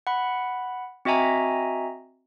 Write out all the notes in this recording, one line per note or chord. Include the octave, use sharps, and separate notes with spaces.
F#5 B5
C4 F#4 D#5 E5 G#5 A#5